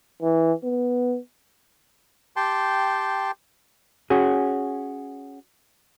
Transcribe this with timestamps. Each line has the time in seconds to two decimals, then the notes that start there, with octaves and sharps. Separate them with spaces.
0.22 E3
0.64 B3
2.36 G4 G5 A5 C6
4.10 C#4 F#4 G#4